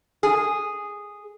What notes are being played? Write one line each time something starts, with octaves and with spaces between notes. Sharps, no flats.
G#4